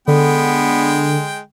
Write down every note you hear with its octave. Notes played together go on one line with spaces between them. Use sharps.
D3 G#3 B3 G5